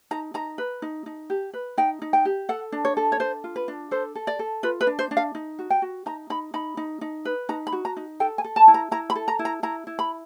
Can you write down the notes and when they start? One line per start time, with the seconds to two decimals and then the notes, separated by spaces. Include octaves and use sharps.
0.11 D#4 A#5
0.34 D#4 A#5
0.58 B4
0.82 D#4
1.06 D#4
1.30 G4
1.53 B4
1.77 D#4 G5
2.02 D#4
2.13 G5
2.25 G4
2.49 A4 F#5
2.72 D4
2.85 C#5
2.97 A4
3.12 C#5
3.20 D4 C5
3.44 F4
3.56 B4
3.68 D4
3.91 A4 C5
4.15 A4
4.27 D5
4.39 A4
4.63 F4 B4
4.81 B4
4.87 D4
4.99 C5
5.11 D4
5.17 F5
5.35 D#4
5.59 F#4
5.70 G5
5.82 F#4
6.06 D#4 A#5
6.30 D#4 B5
6.54 D#4 B5
6.77 D#4
7.01 D#4
7.25 B4
7.49 D#4 A#5
7.67 B5
7.72 F#4
7.85 A#5
7.97 D#4
8.20 A4 G5
8.38 G#5
8.44 A4
8.56 A5
8.68 E4
8.74 A#5
8.91 E4 A#5
9.10 B5
9.15 A4
9.28 A#5
9.39 E4
9.45 A#5
9.63 E4 A#5
9.87 E4
9.99 B5